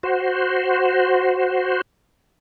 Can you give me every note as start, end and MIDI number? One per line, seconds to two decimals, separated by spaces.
0.03 1.81 66
0.03 1.81 72